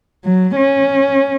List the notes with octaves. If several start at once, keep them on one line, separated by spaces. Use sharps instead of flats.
F#3
C#4